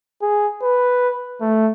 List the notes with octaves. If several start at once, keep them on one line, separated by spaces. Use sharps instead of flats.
G#4
B4
A3